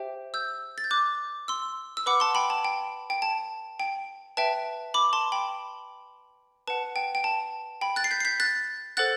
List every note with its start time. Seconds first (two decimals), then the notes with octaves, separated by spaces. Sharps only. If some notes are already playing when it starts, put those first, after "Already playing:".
Already playing: G4 C5 E5 G5
0.34 E6 G6
0.78 A6
0.84 G6
0.91 D6 F#6
1.48 C6 E6
1.97 E6
2.06 B4 F#5 B5 D6
2.20 A5 C6
2.35 G5 B5
2.50 A5
2.65 G5
3.10 G5
3.22 A5
3.80 G5
4.37 B4 E5 G5 A5
4.94 B5 D6
5.13 A5 C6
5.32 G5 B5
6.68 B4 F#5 A5
6.96 G5
7.15 G5
7.24 A5
7.81 G5 B5
7.96 F#6 A6
8.04 C7
8.11 G6 B6
8.20 C7
8.25 G6 B6
8.40 F#6 A6
8.97 A4 C5 F#5 F#6 A6